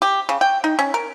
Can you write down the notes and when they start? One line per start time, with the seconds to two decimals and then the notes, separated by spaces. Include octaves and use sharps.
0.02 G4
0.29 C#3
0.41 G5
0.64 D#4
0.79 C#4
0.94 A#4